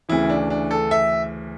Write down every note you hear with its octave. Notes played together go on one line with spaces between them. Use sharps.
D2 C#3 E3 E4
D4
D4
A4
E5